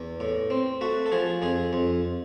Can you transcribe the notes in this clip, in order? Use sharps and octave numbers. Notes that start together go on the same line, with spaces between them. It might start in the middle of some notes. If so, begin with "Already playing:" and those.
Already playing: E2
A2
C4
A3 F#4
A4
F3 G#4
F2 G#4
F2